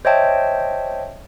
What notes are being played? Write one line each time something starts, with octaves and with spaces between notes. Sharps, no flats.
C5 C#5 D#5 E5 G5 A5